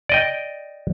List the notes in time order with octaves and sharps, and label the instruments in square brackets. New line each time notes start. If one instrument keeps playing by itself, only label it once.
[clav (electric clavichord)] D5 D#5 G5